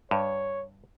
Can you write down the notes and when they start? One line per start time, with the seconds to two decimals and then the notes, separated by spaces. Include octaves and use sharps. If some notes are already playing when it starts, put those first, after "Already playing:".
0.11 G2 C#5